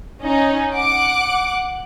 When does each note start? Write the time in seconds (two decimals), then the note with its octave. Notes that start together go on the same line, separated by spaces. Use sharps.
0.24 C#4 D#4
0.75 F#5 D6 F#6